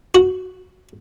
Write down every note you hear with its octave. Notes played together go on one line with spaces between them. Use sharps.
F#4